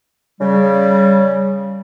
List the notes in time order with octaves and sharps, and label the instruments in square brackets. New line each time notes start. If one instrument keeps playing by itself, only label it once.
[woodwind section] C#3 G3